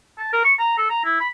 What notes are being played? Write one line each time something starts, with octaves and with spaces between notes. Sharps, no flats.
A5
A#4
C#6
A#5
A4
A#5
E4
B5